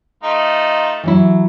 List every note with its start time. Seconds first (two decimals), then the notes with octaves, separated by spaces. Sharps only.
0.23 A3 D#4 F4
1.04 E3 F#3 E4